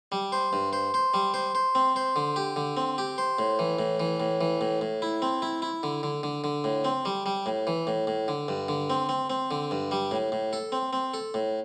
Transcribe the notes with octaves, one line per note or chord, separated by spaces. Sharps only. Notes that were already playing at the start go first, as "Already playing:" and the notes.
G3
C5
G2
C5
C5
G3
C5
C5
C4
C5
D3
G4
D3
C4
G4
C5
A2
E3
A2
E3
A2
E3
A2
A2
E4
C4
E4
E4
D3
D3
D3
D3
A2
C4
G3
G3
A2
E3
A2
A2
D3
G2
D3
C4
C4
C4
D3
G2
G3
A2
A2
A4
C4
C4
A4
A2